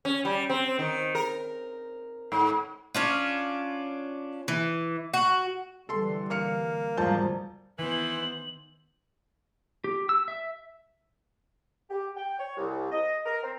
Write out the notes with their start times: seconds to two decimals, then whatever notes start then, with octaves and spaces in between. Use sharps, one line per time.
0.05 C#4
0.25 G3
0.50 C4
0.79 D#3
1.15 A#4
2.32 G#2
2.95 C#4 D4 F4
4.48 E3
5.14 F#4
5.89 D3 E3 G3 A4 C6
6.30 A#3 F5 F6 C#7
6.97 E1 D2 G#2 F3 G3 A5 G6
7.79 D#3 E3 B3 C5 F#7
9.84 G4
10.09 E6
10.28 E5
11.90 G4
12.17 G5
12.39 C#5
12.57 C2
12.92 D#5
13.26 A#4
13.43 C4